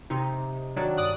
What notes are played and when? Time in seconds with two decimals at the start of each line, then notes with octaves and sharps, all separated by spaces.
0.10 C3 D#4
0.76 D#3 F#3 D4 F#4
0.98 G2 D5 D#6 F#6